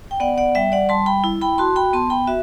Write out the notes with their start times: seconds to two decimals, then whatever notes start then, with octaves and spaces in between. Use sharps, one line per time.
0.11 G5
0.20 B3 D5 F#5
0.38 D5 F#5
0.55 G3 E5 G5
0.72 D5 F#5
0.89 G3 A5 C6
1.06 G5 B5
1.24 E4
1.41 G5 B5
1.58 F#4 A5 C6
1.76 G5 B5
1.93 B3 A5 C6
2.10 G5 B5
2.27 F#4 E5